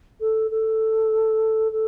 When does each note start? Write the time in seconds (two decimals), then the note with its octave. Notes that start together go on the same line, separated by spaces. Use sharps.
0.20 A4
0.50 A4
1.71 A4